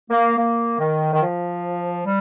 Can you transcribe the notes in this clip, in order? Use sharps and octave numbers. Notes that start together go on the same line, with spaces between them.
A#3
A#3
D#3
D#3
F3
G3